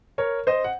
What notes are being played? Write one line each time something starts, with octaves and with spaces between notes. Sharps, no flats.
A#4 C#5
C5 D#5
F#5